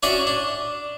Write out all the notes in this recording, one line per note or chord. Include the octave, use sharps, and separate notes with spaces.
C#4 D4 F#4 D5 E5
D4